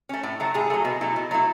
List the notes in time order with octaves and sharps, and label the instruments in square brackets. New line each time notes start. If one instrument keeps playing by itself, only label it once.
[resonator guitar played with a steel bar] A3 C#4
A2
F#3 A3
A2 G#4
F#3 A3
B2
F#3 A3 E4
B2
F#3 A3 E4